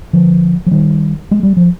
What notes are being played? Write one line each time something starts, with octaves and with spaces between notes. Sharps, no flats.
D3 F3
F3
D#3 G3
G#3
G3
F3